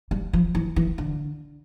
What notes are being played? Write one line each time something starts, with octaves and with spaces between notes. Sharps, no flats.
G3
F3
E3
E3
D3